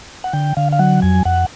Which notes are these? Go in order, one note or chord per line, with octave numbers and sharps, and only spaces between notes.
F#5
D3 G5
D3 F5
F5
F#3 F#5
F2 G#5
F2 F#5